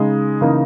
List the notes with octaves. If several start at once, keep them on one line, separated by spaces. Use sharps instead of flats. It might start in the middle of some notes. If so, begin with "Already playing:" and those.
Already playing: C#3 G#3 D#4
C#3 E3 A#3 D#4